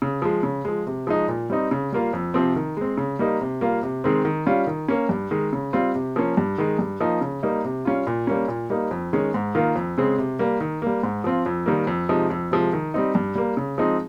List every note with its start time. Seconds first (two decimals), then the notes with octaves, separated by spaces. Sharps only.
0.02 C#3
0.22 F3 G#3
0.43 C#3
0.65 F3 G#3
0.87 C3
1.07 F3 G#3 D#4
1.28 A#2
1.50 G3 C4 D#4
1.71 C#3
1.93 G3 A#3 F4
2.13 F2
2.34 C3 F3 C4
2.56 D#3
2.77 G#3 C4
2.97 C#3
3.19 G3 A#3 D#4
3.41 C3
3.61 G3 A#3 F4
3.83 C3
4.04 D#3 G#3 C4
4.25 D#3
4.46 G3 C#4 F4
4.67 D#3
4.88 A#3 C#4
5.09 G2
5.31 D#3 G#3
5.53 C#3
5.73 G3 C4 F4
5.95 C3
6.16 F3 A#3 C#4
6.37 G2
6.58 D#3 G#3
6.79 G2
7.00 F3 A#3 D#4
7.21 C#3
7.43 G3 A#3 D#4
7.65 C3
7.85 G3 C#4 F4
8.07 A#2
8.27 G3 A#3 C#4
8.48 A#2
8.70 G3 A#3 D#4
8.91 F2
9.13 D#3 G#3 C#4
9.34 G#2
9.55 D#3 A#3 F4
9.76 F2
9.98 C#3 G#3 C4
10.18 C3
10.39 G3 A#3
10.60 D#3
10.82 G3 A#3
11.03 G#2
11.24 F3 C4 F4
11.46 F2
11.66 D#3 G3 A#3
11.87 F2
12.09 C3 F3 G#3 D#4
12.30 F2
12.51 C3 F3 G#3
12.73 D#3
12.94 G3 C4 D#4
13.15 G2
13.35 G3 A#3
13.57 C#3
13.78 F3 G#3 C4 D#4